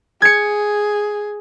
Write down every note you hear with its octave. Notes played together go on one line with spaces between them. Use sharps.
G#4 G#6 C#7